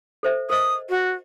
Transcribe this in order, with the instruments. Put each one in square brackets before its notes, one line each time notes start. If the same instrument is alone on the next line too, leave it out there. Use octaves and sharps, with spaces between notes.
[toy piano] A4 C5 E5
[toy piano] A#4 C5 D#5 [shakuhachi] D#6
[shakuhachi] F#4